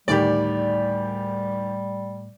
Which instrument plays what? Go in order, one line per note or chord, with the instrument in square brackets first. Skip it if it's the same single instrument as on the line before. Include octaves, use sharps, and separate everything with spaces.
[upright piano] D2 D#3 G4 [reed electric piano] A2 A3 [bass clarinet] G3 [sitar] D5